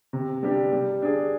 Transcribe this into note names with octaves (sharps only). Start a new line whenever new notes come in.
C3
G3 D4 G4
G3
D4 G#4